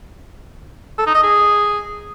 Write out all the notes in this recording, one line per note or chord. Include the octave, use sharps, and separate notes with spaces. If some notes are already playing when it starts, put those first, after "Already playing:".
A4
D#4
D#5
G#4